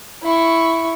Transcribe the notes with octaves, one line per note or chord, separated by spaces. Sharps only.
E4 C#6